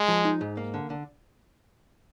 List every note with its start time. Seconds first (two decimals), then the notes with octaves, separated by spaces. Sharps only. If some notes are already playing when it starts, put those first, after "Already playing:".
Already playing: G#3
0.08 F3
0.25 D#4
0.41 G#2
0.57 A#3
0.74 D3
0.90 D3